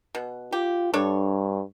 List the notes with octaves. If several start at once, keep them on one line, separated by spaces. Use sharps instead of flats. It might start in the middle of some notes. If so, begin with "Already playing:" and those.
B2
F4 G4
G2 D4 A4 C#5